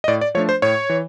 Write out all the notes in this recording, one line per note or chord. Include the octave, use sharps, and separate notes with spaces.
D#5
A2 D5
D5
F3 A3 D4 C#5
C5
A2 C#5
E3